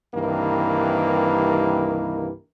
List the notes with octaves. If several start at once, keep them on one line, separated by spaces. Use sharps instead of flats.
C2 G2 D#3 E3 A#3